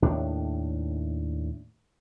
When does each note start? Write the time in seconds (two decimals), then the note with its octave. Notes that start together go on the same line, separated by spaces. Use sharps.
0.02 D#2 A2 D4